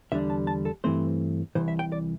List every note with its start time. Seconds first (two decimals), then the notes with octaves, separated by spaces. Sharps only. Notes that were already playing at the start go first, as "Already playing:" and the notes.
0.12 E2 D3 G3 D4 E5
0.30 A5
0.47 A5
0.65 A4
0.84 G2 E3 A3 C4 C5
1.55 C2 C3 E3 C5
1.68 E5
1.79 G5
1.92 D5